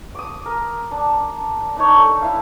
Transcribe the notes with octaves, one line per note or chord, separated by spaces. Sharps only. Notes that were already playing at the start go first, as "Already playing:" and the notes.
D6 D#6
A#4
D4
D4 D#4 C#5
A4
E4 F5